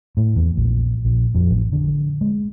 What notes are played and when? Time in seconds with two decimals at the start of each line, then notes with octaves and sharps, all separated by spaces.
0.17 A2
0.36 E2
0.57 A#1
1.05 A#1
1.35 F2
1.51 A1
1.72 D3
2.21 G#3